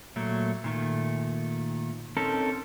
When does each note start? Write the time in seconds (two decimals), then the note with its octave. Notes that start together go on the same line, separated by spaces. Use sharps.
0.16 A#2 F#3 A3 A#3
0.64 A#2 D#3 A3
2.17 C4 C#4 D#4 A4 A#4